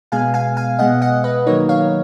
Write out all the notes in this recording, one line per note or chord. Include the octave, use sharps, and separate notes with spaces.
B2 G#3 B3 F5 G#5
F5 G#5
F5 G#5
B2 G#3 B3 D#5 F#5
D#5 F#5
B4 D#5
D#3 F#3 A#3 D#4 A#4 C#5
C#5 F5